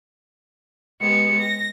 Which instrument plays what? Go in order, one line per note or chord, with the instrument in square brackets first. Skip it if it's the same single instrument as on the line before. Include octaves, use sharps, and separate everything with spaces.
[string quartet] G#3 B3 G4 [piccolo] C#7
[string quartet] A#6